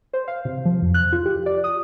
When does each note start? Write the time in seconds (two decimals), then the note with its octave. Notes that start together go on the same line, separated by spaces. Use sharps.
0.13 C5
0.28 F5
0.45 C3
0.65 F3
0.82 F2
0.94 F#6
1.13 F4
1.26 G4
1.46 D5
1.64 D#6